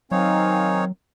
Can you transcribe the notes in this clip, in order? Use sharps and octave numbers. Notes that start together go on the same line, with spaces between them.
D#3 F#3 C4 D#4 C#5 F5 G#5